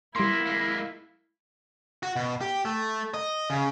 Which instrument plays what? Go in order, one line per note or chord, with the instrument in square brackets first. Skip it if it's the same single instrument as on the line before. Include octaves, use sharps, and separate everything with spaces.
[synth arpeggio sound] G3 C6 [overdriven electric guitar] A#3 B3 [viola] E4
[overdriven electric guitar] G#3 A#3
[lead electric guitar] F#4
B2
G4
A3
D#5
C#3